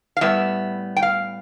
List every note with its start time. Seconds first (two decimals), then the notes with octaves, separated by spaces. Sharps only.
0.17 F5
0.21 A2 G3 B3 E5
0.96 G5
1.02 F5